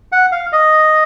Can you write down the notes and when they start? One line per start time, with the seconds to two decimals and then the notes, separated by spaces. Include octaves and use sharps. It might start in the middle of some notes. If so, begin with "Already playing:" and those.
0.12 F#5
0.32 F5
0.52 D#5